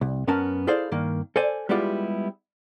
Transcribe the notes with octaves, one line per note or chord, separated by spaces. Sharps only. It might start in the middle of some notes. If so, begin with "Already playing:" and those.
C2
F#2 B3 C#4 A#4 A5
E4 G#4 A4 C5 D5 F5
G2 D#3 A#3
A4 C5 D5 G#5
G3 G#3 B3 E4 F4 G4